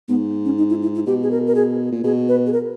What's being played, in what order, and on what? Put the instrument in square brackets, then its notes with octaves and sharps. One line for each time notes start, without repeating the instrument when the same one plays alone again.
[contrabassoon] G#2 [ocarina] B3
[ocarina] C#4
D#4
E4
E4
E4
[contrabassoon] B2 [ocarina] G4
[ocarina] G#4
A#4
A#4
G#4
[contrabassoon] A#2
[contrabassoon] B2 [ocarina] G#4
[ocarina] B4
G#4
A#4